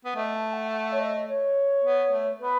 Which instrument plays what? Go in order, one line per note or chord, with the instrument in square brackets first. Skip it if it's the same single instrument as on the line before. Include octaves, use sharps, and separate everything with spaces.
[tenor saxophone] B3
[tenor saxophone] A3 [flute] D#5
[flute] A5
F#5
F#5
C#5
D#5
C#5
[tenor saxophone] B3
A3
[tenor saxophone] B3 [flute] B4